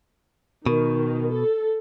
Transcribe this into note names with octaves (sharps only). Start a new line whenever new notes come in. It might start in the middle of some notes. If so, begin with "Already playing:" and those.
B2 D#3
A4